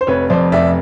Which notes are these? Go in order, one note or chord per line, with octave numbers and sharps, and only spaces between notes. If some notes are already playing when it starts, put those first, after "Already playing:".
C5
F1 B4 C#5
F2 C5 D5
F1 D5 E5